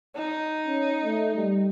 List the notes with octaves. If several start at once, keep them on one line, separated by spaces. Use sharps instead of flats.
D#4
C#4
A3
G3